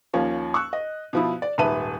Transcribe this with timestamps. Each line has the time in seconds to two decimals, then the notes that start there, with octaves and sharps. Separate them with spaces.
0.13 D#2 F3 C#4
0.54 C#6 E6 F#6
0.73 D#5
1.13 B2 F3 E4
1.42 D5
1.58 D#1 G#2 B4 E5 A5 D#7